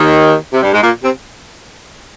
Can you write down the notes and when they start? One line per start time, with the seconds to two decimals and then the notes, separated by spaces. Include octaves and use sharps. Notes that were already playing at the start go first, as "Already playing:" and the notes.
Already playing: D#2 D#3
0.53 C3
0.63 G2 G3
0.73 G#2 G#3
0.83 A#2 A#3
1.03 C3 C4